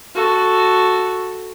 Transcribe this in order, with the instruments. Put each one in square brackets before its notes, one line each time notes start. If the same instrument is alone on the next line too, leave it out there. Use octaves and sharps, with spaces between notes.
[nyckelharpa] F#4 A4